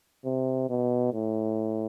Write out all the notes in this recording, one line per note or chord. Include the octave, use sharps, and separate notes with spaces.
C3
B2
A2